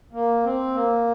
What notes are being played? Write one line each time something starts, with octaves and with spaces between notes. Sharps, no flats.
A#3
C4
A#3